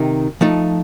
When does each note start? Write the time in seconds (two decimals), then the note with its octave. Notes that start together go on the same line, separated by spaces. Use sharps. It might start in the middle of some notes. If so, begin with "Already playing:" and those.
Already playing: C3 D#3 D#4
0.41 F3 A3 D#4